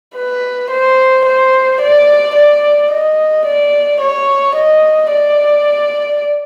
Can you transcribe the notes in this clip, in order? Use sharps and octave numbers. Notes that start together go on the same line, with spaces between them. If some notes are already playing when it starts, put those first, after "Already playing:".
B4
C5
C5
D5
D5
D#5
D5
C#5
D#5
D5